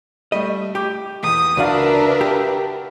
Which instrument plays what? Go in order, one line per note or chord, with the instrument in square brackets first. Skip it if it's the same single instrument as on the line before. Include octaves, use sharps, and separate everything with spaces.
[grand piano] G3 A3 [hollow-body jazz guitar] D#5
[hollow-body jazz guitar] G4 [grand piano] D6 G6
[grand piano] E2 [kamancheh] D#6
[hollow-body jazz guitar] C#2 [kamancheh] D4 E5 [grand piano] F#4 D5 F5 [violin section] A#4 B4
[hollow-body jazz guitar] G4